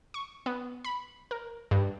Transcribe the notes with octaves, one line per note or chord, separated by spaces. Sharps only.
C#6
B3
B5
A#4
G2